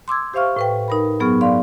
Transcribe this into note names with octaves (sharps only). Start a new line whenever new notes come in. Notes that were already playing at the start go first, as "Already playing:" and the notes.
C6 D6 E6 G#6
G4 C5 E5 F5 C#6 F6
A2 B4 G5
D#4 A#4 B5
G2 F#3 B3 G#4 C#6 F6
D5 F5 C6